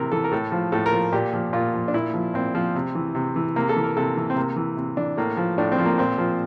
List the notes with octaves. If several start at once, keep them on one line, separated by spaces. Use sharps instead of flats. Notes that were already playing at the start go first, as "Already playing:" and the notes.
Already playing: C3 E3 A#4
E3 A4
A#4
A2 A4
F3
A2 A4
A#4
F3
A#2 G4
F3
A#2 F4
F3
D4
A#2 E4
F3
A#2 C4
F3
C3
E3
C3
E3
C3 A#3
A4
E3
A#4
C3 A4
E3
C4
C3 A#3
E3
C3
E3 D4
A2 A#3
F3
A2 D4
C4
F3
A#3
A#2 C4
F3